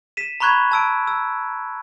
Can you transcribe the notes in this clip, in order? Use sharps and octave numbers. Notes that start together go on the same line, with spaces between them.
B6 D#7 E7
A#5 B5 C#6 F#6 G#6
A5 E6 D7
E6